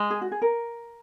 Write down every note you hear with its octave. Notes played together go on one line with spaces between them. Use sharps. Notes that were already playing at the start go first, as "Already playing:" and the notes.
Already playing: G#3
G#4
F#4
G#4
A#4